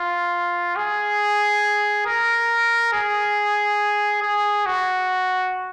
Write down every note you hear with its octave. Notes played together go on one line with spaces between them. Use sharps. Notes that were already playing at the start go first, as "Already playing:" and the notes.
Already playing: F4
G#4
A#4
G#4
G#4
F#4